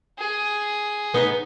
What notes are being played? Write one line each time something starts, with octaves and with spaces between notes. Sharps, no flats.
G#4
B3 D#4